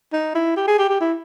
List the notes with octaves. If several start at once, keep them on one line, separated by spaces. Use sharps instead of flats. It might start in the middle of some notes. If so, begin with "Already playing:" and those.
D#4
E4
G4
G#4
G4
G4
E4